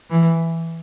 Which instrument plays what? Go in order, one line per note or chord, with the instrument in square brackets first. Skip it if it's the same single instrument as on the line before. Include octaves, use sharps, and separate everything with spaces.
[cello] E3